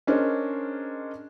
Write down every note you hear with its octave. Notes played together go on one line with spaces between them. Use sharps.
C#4 D4 G#4 A#4 C5 D#5